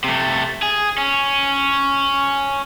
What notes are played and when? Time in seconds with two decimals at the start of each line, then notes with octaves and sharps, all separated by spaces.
0.04 C3 A3
0.63 G#4
0.98 C#4